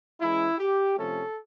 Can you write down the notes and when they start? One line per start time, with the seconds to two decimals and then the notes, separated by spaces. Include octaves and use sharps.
0.21 E3 G#3 C#4 E4
0.59 G4
0.97 C3 F3 A3 C#4 A4